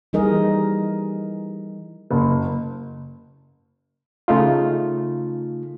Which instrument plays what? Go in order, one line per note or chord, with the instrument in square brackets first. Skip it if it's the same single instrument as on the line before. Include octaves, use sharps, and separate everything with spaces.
[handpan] E3 G3 D#4 G#4 A#4 D#5
[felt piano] F#1
[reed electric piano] C#3 A3 D#4 F4